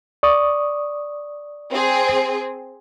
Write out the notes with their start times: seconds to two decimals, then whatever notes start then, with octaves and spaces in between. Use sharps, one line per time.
0.23 D5 C#6 D#6
1.71 C4 G#4